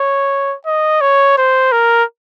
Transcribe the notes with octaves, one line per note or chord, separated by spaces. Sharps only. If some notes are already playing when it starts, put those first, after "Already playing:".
Already playing: C#5
D#5
C#5
C5
A#4